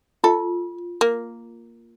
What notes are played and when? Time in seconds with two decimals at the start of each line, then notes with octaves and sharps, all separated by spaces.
0.24 F4 A4
1.01 A#3